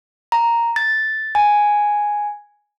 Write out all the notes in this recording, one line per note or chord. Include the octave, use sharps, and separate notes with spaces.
A#5
A6
G#5